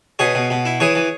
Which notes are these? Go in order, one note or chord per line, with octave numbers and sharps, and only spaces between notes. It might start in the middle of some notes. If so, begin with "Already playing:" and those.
B2 G#4 C#5
B2
B2
E4
E3 G#4 C#5
E3